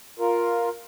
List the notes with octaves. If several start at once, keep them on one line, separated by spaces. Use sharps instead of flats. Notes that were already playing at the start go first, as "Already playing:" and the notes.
F4 A#4